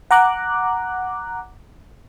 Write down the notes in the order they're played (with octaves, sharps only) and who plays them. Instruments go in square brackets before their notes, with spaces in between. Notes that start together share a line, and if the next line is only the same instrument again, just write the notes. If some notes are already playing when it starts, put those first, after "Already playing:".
[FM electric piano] F#5 A#5 D6 F#6